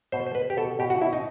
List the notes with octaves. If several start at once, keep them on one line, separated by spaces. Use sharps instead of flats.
B2 C5
C5
B2 B4
G4
B2 A4
B2 G4
F#4
B2 E4
D#4